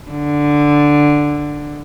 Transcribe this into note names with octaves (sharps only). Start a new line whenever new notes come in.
D3